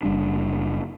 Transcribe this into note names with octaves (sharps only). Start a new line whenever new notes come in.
F#1 G3 D4